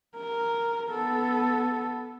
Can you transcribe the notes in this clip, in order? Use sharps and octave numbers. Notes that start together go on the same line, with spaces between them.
A#4
B3 A4